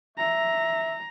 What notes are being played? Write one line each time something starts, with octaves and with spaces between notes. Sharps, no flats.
E5 A#5